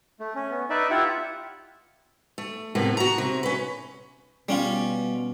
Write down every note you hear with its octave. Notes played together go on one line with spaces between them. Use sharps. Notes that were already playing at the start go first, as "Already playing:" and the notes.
A3
C#4
B3
D#4 B4 D5 E5
E4 F4 G4 E5 F#5
A3
A2 C3 A#3 B3
F#4 A#5
C3
C#4 B4
B2 G3 C#4 F4